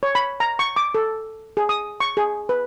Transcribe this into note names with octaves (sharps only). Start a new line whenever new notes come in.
C#5
B5
A#5
C#6
D6
A4
G#4
D#6
C#6
G#4
B4